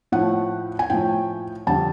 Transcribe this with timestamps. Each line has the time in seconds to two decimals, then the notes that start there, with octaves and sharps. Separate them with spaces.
0.12 A2 F3 A3 F#5
0.79 G#5
0.90 A2 F3 A3 G5
1.67 F2 D3 G3 A5